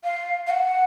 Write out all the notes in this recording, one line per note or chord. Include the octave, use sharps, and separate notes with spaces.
F5
F5
F#5